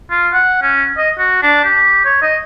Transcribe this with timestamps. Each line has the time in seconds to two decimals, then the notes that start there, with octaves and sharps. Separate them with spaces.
0.10 F4
0.33 F#5
0.62 C#4
0.97 D#5
1.18 F#4
1.42 D4
1.64 G4
2.05 C#5
2.22 D#5